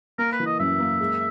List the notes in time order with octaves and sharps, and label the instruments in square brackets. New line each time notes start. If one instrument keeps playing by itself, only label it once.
[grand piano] A#3 [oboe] A#4
[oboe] B4
[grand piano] E3
[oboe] D#5
[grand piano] F#2 [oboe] E5
[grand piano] A#3
G#3